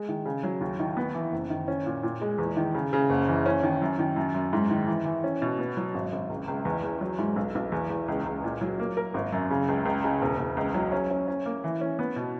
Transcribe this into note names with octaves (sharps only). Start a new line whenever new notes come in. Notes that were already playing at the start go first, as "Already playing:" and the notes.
Already playing: G#3
D#3
C#3
F#3
D#2
D#3
B3
E3
F#1
D#3
C#4
A#2
A#2
G#3
E2
D#3
C#3
C#3
F#1
E3
C#4
D#3
F#2
D#3
F#2
F#2
G#2
D#3
E3
E3
C#4
B2
B3
F#3
G#1
G#1
C#2
C#2
E2
E2
F#3
G#2
B1
B1
E2
E2
C#2
C#2
A#2
F#3
A#3
A#4
G#1
F#2
C#3
C#2
C#2
C#3
E1
E1
C#2
F#3
C#4
C#4
C#4
A#3
E3
C#4
B3
B2